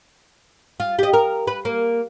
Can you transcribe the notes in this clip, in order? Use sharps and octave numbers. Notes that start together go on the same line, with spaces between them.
F4
G4 D#5
A#4
B4
A#3